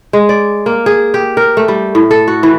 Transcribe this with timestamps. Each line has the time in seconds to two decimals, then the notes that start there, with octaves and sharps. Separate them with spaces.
0.13 G#3
0.29 D5
0.66 A#3
0.86 G#4
1.14 G4
1.37 A#4
1.57 A3
1.68 G3
1.95 A2
2.11 A4
2.28 F#4
2.43 E3